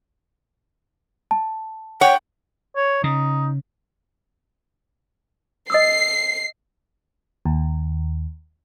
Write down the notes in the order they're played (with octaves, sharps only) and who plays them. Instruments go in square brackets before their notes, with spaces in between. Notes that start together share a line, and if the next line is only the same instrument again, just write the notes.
[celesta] A5
[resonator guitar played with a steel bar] C#5 [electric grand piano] F#5 [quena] G5
[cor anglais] C#5
[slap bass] C#3 [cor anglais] D#4
[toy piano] D#5 D#6 E6 [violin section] C7
[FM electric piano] D#2